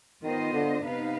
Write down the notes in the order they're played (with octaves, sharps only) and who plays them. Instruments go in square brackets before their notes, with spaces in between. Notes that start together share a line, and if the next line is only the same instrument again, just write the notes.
[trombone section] D#3 [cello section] B3 F4 C5 D#5
[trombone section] D3
[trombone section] C3 [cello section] B3 D#4 B4 F5